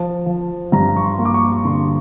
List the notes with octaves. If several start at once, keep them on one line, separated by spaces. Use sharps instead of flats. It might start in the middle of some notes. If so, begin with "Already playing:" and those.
Already playing: F3 A5
F3
G2 A#5
C#6
C6
A#3
D6
C#6
D3 C6